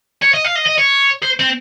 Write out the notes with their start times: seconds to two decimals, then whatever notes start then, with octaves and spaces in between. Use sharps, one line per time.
0.22 C#5
0.34 D#5
0.45 F5
0.56 D#5
0.67 D#5
0.79 C#5
1.23 C5
1.40 C4